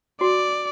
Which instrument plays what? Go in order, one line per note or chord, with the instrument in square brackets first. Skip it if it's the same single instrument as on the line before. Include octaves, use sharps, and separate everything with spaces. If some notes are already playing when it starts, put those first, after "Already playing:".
[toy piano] F#4 [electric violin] D5